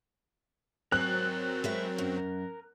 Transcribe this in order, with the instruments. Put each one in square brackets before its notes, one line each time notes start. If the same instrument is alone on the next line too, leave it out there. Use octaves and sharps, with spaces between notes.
[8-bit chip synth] F#3 C4 [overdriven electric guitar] A#4 G#5 [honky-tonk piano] F#6
[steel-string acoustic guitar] G#3 B4 E5
F#2